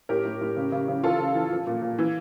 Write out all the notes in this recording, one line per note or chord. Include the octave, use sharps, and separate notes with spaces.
A2 G4 A#4
A2
A2
C#3
C#3
C#3
E3 F4 A4
C#3
E3
F3
A#2
A#2
E3